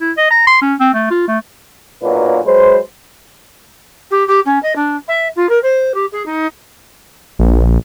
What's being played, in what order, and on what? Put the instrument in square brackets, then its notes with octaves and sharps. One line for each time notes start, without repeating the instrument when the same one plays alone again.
[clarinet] E4
D#5
A#5
C6
C#4
C4
A3
F4
A3
[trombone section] B1 A#2 F#3 A#3 D4 B4
F#3 G#3 B4 C5
[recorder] G4
G4
C#4
D#5
D4
E5
F4
A#4
C5
G4
G#4
D#4
[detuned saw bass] A#1